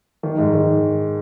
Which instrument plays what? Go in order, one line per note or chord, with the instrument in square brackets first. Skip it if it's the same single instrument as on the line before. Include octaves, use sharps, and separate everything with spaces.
[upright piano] D#3
G#2
D#3